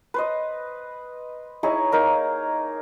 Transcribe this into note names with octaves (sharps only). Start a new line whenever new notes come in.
B4 C5 D#5
D#4 E4 G#4 C#5
A#3 D#4 A#4